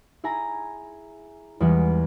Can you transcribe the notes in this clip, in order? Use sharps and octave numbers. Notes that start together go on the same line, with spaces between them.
E4 G#4 G#5 A#5
E2 E3 G3 G#3 B3